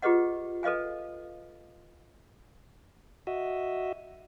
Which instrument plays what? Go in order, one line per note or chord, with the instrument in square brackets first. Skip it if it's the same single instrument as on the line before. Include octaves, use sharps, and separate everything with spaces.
[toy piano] F4 G4 G#4 B4 D#5 F#5
A4 B4 D#5 F5 G#5
[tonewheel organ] F#4 D#5 E5